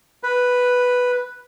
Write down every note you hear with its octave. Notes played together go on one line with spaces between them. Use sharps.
B4